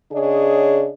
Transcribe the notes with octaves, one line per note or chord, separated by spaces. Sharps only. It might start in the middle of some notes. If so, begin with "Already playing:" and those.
C#3 D4 G#4 C#5 D#5